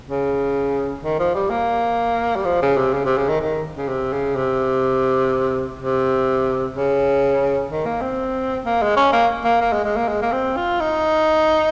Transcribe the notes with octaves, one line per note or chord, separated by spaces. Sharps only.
C#3
D#3
F3
G3
A#3
G3
F3
C#3
C3
C#3
C3
C#3
D#3
D#3
C#3
C3
C#3
C3
C3
C#3
D#3
A#3
C4
A#3
G#3
C#4
A#3
A#3
A#3
G#3
G#3
A#3
G#3
A#3
C4
F4
D#4